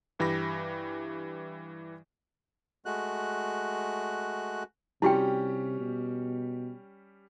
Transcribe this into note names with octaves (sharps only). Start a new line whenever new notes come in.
G2 E3 G4 B5 A#6
G#3 A3 F#4 F#6
C3 G3 C#4 E4 F#4 G4 G5
B2